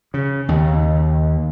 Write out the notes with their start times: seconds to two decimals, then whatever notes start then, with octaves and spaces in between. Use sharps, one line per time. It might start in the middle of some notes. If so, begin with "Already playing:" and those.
0.14 C#3
0.48 D#2